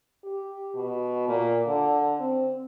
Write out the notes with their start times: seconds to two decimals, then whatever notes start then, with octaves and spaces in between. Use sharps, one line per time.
0.24 G4
0.75 B2
1.28 A#2
1.67 D3
2.20 C4